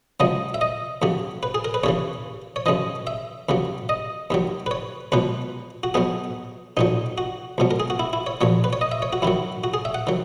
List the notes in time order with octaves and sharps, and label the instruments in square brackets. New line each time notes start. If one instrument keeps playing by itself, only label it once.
[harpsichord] C#2 C#3 F#3 D#5
E5
D#5
D#2 C#3 F#3
B4
G#4
A#4
B4
D#2 C#3 E3 C#5
C#5
F#2 C#3 E3 D#5
E5
D#2 C#3 F#3
D#5
D#2 D#3 F#3
B4
C#5
C#2 B2 F#3 B4
F#4
B1 B2 F#3 G#4
B1 A#2 F#3 D#4
F#4
C#2 B2 F#3
A#4
G#4
F#4
E4
E4
C#5
A#1 A#2 F#3 C#5
B4
C#5
D#5
E5
C#5
F#4
F#2 D#3 F#3 E4
F#4
G#4
E5
F#5
D#3 F#3